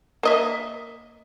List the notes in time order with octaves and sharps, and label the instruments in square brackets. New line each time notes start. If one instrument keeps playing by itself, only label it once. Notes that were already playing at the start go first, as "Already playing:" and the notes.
[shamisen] A#3 D#5 E5